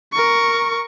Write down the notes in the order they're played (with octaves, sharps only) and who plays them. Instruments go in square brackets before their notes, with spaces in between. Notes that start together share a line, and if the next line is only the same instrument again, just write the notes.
[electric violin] A#4 C#6